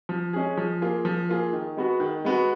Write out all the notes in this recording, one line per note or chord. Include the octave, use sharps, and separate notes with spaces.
F3
G#3 C#4 G#4
F3
A#3 F4 G#4
F3
A#3 F4 G#4
D#3
G#3 B3 F#4
D#3
G#3 B3 F#4